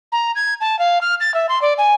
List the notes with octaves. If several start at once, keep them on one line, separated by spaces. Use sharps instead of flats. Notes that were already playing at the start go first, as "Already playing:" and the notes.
A#5
G#6
A5
F5
F6
A6
E5
C6
D5
G#5